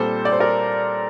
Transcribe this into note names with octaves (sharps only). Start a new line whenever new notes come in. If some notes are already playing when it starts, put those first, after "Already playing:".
Already playing: A#2 G3 C4 A4 C5
D5
C5
A#4 D5